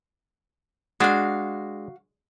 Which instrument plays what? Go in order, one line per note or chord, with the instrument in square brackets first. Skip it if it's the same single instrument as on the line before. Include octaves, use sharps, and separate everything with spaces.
[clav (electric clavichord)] G#3 D4 [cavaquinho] F#4 F5